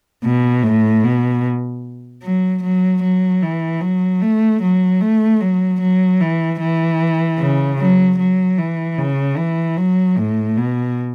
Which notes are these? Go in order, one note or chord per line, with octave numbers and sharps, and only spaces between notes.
B2
A2
B2
F#3
F#3
F#3
E3
F#3
A3
F#3
A3
F#3
F#3
E3
E3
C#3
F#3
F#3
E3
C#3
E3
F#3
A2
B2